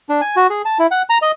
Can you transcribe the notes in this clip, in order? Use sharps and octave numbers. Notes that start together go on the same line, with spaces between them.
D4
G#5
F#4
G#4
A5
E4
F#5
A#5
D#5